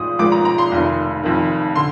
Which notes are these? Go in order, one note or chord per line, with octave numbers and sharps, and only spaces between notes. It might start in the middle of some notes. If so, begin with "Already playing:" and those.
Already playing: G#1 G#2 F3 A#3 D#6
G#1 G#2 F3 A#3 D6
A#5
A#5
C6
F1 F2 D#3
F1 F2 D#3
D3 C6